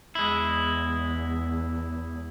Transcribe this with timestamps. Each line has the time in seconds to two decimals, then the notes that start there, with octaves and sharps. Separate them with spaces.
0.15 E2 G#3 E4